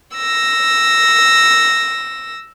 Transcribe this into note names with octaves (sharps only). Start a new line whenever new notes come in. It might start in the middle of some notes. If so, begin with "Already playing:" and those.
E6 A#6